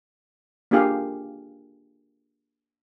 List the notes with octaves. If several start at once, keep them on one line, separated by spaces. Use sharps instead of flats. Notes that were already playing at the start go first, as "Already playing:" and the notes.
A#3 D4 F4 G4 G#4 F5